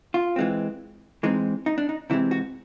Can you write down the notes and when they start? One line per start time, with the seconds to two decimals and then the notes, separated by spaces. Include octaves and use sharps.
0.14 F4
0.36 E3 G#3 C4
1.23 E3 G#3 C4 D#4
1.66 D#4
1.78 D4
1.89 D#4
2.10 C3 E3 G#3 C4 E4
2.31 F#4